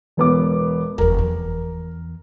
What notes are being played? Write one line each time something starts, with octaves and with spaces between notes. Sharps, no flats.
E1 B3 D6
F1 E2 A#4
E2